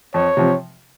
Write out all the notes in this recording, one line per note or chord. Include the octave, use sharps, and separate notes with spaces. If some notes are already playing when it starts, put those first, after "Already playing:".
F2 C#5
C3 F3